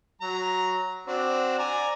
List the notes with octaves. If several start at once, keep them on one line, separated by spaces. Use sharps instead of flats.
F#3 A#5
C4 D4 F#4
D5 G#5 A#5